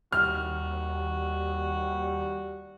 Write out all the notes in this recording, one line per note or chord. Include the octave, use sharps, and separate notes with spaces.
D#2 G3 F#4 F6